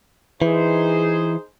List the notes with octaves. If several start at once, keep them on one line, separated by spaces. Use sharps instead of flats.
E3 D#4 G#4 C5